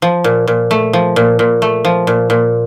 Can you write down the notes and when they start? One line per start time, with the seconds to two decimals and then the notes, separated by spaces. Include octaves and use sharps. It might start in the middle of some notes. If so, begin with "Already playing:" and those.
0.02 F3
0.24 A#2
0.47 A#2
0.71 A3
0.93 F3
1.16 A#2
1.39 A#2
1.62 A3
1.85 F3
2.07 A#2
2.30 A#2